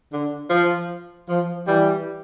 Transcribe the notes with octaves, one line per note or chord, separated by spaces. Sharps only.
D3
F3
F3
E3 G3